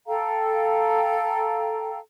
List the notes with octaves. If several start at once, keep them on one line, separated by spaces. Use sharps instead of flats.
A4 F5 G5 A#5